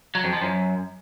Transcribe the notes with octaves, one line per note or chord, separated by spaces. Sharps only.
F#3
F2
F3
F#2